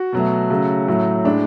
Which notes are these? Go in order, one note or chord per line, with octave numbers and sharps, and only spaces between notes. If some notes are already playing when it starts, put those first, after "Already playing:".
Already playing: F#4
B2 F#3 A3
C#3 F#3 A3
A2 F#3 A3
A2 G#3 D4